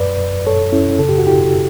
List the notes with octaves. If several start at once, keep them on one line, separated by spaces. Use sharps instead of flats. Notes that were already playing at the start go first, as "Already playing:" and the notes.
Already playing: F#2 B4 D5
F#2
F#2 A4 C#5
F#2 C#4 E4
C#3 A4
G4
F#4
F#2 E4 G4